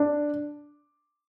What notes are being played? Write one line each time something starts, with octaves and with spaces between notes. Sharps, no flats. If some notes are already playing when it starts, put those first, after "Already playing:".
Already playing: D4